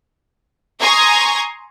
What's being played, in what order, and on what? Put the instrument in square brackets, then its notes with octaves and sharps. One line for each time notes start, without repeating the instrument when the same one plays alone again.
[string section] G#5 A#5 C6 C#6 D#6 G#6